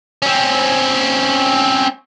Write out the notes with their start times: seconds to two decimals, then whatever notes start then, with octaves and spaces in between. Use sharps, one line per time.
0.22 C4 C#4